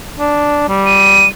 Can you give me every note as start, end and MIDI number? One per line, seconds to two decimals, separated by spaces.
0.20 0.66 62
0.69 1.26 55
0.86 1.27 99